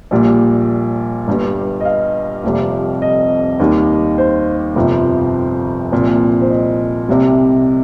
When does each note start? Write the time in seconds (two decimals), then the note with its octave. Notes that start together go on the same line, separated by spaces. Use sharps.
0.11 A#1 A#2 G3
1.27 G1 G2 G3
1.81 D#5
1.85 F5
2.44 F1 F2 C3 G3
3.02 D#5
3.60 D#2 D#3 G3
4.18 C5
4.75 G1 F2 C3 F3
5.92 C2 A#2 F3
6.41 C5
6.50 D#5
7.09 C2 C3 G3